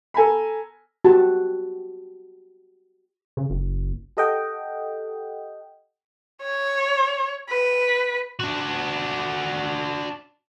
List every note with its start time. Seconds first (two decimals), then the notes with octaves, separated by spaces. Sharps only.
0.14 A4 G#5 A#5 B5
1.05 F#4 G4 A5
3.37 C#3
3.50 F#1
4.17 G4 A4 D#5 F#5 G5
6.42 C#5
7.49 B4
8.40 D4 F#4